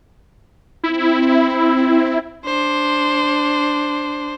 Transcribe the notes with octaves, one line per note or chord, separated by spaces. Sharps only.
C4 E4
D4 C5